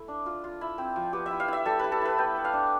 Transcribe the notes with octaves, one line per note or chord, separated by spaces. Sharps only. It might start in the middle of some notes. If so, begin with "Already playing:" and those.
Already playing: A3 E4
D4
F4
F4
E4
C4
F3
B3 G4
E5
E4
F5
E4 E5
G3 A4
E4 B4
A4
E4 B4
B3 G5
B3
F5
D4